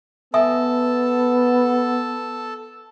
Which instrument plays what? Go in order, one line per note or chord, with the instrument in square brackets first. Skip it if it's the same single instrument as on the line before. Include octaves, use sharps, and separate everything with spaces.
[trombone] B3 [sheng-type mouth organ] A4 A5 [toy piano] E5 G#5 D#6